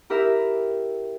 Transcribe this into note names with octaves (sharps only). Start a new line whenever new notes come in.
E4 G4 A#4 E5